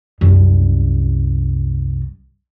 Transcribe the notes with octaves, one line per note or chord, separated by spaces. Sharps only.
C2 F#2